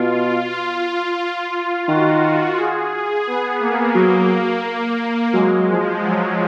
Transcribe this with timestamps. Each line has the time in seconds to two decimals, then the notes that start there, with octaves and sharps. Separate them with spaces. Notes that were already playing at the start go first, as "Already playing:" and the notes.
Already playing: B2 F4
0.50 F4
1.88 D#3 F#4
2.58 G#4
3.27 B3
3.61 A#3
3.95 F#3 A#3
4.64 A#3
5.34 F#3 G#3
5.70 F3
6.03 F#3